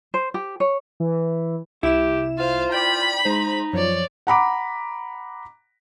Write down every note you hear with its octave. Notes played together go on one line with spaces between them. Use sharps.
C5
G4
C#5
E3
C2 E4 G4 E7
F4 C5 F5
D5 G5 B5
G#3 D#4 C5
F#2 F3 C#5 D5
F#5 A#5 B5 D6